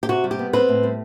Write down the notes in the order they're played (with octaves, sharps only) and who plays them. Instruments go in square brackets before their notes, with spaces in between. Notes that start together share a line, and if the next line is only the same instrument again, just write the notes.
[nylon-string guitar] G4
C3 F#4
G3
G4
B3
C4 B4
A2
G3